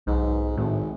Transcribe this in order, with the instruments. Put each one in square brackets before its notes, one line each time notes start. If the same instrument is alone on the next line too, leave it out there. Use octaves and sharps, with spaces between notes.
[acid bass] B1 [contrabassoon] G#2
[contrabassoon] G#1 [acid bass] A2